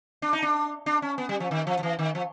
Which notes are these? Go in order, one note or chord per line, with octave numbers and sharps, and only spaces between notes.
D4
D#4
D4
D4
C#4
B3
G3
F3
D#3
F3
F3
E3
D#3
F3